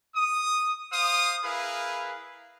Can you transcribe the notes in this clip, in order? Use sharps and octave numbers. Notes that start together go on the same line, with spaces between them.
D#6
C5 F5 D#6
E4 G#4 A#4 B4 F5